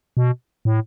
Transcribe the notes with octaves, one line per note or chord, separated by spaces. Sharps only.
B2
A2